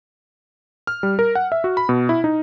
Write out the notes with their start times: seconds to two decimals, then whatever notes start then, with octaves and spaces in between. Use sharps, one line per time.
0.87 F6
1.03 G3
1.19 A#4
1.35 F#5
1.52 E5
1.64 F#4
1.77 B5
1.89 B2
2.09 E4
2.24 D#4